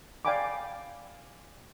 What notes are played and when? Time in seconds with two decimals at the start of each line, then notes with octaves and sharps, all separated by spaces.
0.25 D5 F5 G5 G#5 B5 D6